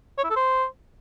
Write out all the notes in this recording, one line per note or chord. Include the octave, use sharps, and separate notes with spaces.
C#5
E4
A4
C5